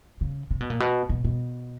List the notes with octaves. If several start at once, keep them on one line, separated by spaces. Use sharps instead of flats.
C#3
C3
B2
A#2
B2
B2
B2